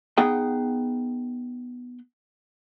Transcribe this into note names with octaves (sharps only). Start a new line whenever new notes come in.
B3 D#4 G#4 F#5 G5